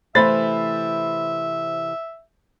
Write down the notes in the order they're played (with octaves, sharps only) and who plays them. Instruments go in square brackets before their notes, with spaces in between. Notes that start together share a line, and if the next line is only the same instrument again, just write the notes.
[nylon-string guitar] C3 E3 A3 [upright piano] C5 B5 A6 [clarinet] E5